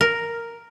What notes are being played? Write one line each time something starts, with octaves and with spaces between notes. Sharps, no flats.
A#4